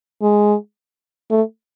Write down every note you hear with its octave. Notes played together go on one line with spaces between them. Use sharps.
G#3
A3